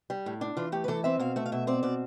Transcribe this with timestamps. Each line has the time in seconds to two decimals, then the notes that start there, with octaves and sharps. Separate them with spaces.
0.10 G3
0.26 A2
0.41 D4
0.57 E3 F4
0.72 A3 G4
0.84 B4
0.88 E3 A4
1.04 C4 E5
1.19 B2 F5
1.36 A3 E5
1.46 F5
1.52 B2 E5
1.67 C4 D5
1.83 B2 D5